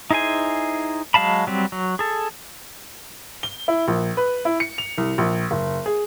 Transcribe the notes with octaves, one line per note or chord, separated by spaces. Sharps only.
D#4 E4 G#4 C5 G#5
F#3 G#3 F5 A5 B5
F#3 G3 C4
F#3
G#4 A4
G7
E4
A#1
B4
E4
C#7
F7
C2
A#1
F#1
G#4